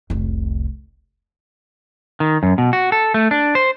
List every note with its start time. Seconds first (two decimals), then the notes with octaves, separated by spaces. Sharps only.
0.10 F1 C2
2.20 D#3
2.43 F#2
2.58 B2
2.73 F#4
2.92 A4
3.14 A3
3.31 D4
3.55 C5